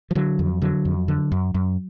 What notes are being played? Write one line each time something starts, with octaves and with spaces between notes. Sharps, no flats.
F3
D3 F#3
F2
D3 F#3
F2
D3
F#2
F#2